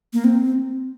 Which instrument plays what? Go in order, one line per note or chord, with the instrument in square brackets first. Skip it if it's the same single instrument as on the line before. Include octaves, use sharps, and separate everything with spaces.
[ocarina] A#3
C4